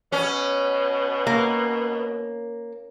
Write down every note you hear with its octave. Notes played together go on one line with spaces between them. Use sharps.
B2 C#4
A#3